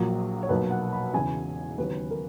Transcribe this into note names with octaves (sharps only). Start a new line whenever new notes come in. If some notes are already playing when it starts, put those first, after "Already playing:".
Already playing: A#1 A#2 F#3 A#3
C#5
B1 B2 F#3 A#3 B4
F#5
B5
E1 E2 C#3 G#5
E1 D#2 C#3 F#3 B4
A#4